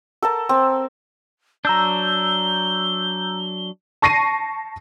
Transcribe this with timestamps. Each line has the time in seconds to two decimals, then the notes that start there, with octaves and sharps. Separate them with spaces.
0.22 A4 A#4 A5
0.49 C4
1.65 F#3 D4 A#5 E6 G6 G7
4.02 A5 C#6 A#6 C7 D#7